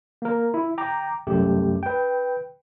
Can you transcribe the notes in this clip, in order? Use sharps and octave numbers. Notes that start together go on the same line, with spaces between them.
A#3 A#4
E4
G5 A#5 D6
C2 F#2 A3 G4
B4 G5